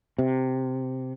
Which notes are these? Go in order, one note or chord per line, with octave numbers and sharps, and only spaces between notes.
C3